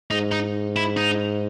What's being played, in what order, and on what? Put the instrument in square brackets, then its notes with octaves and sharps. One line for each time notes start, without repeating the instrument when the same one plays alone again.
[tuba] G#2 [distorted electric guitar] D#4
[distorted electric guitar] D#4
E4
D#4